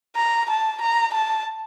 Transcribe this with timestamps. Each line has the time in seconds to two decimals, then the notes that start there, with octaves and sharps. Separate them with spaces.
0.16 A#5
0.50 A5
0.81 A#5
1.14 A5